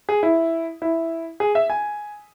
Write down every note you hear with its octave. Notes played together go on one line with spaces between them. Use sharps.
G#4
E4
E4
G#4
E5
G#5